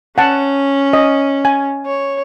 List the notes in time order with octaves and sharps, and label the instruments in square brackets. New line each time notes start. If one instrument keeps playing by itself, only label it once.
[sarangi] C#4 [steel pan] F#5 A5
[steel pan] D#5
G#5
[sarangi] C#5